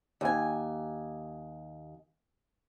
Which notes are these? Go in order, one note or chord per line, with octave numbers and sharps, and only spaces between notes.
D#2 G#5